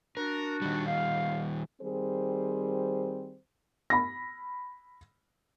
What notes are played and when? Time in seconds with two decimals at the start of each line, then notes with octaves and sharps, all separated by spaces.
0.17 D4 F#4 A#4
0.62 D#3 G3
0.87 F5
1.81 D#3 G3 C4 G#4 C5
3.90 B5 A#6